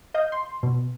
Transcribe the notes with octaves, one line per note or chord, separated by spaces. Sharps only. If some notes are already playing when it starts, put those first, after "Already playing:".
D#5 F5 G6
C6
B2